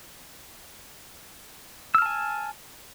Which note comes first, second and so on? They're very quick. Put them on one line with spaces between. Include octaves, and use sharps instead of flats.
E6 F6 A5 G#5